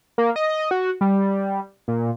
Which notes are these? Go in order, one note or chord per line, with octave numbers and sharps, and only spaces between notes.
A#3
D#5
F#4
G3
A#2